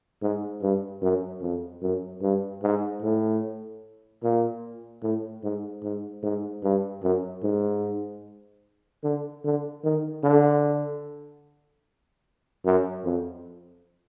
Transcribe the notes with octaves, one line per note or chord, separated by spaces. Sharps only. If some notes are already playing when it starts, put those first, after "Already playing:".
G#2
G2
F#2
F2
F#2
G2
G#2
A2
A#2
A2
G#2
G#2
G#2
G2
F#2
G#2
D3
D3
D#3
D3
F#2
F2